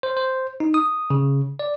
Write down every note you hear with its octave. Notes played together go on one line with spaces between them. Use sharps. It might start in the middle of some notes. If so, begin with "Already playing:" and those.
C5
C5
D#4
D#6
C#3
D5